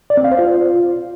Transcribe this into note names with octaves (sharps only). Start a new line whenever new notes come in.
D5
C4
F5
C5
F4